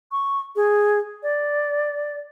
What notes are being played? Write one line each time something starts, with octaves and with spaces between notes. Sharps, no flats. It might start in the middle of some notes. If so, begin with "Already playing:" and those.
C#6
G#4
D5